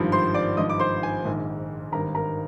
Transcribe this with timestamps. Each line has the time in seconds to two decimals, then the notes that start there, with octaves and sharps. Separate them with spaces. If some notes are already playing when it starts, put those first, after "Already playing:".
Already playing: G#1 G2 F3
0.12 C5 C6
0.34 D5 D6
0.57 G#1 G2 F3 D#5 D#6
0.69 D6
0.79 C5 C6
1.03 G#5
1.25 A#1 G#2 D#3
1.92 G#1 G2 D#3 A#4 A#5
2.15 A#4 A#5